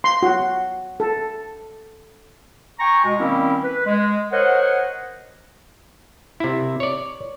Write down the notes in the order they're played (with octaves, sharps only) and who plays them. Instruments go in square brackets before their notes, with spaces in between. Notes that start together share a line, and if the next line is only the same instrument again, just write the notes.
[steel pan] C6
F#4
A4
[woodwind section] G5 G#5 A#5 C#6
B2 G#3
D#3 G3 A#3 C4 C#4 E4
B4
G#3
A#4 C5 C#5 D#5 F#5
[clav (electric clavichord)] C3 E4
C#5 D5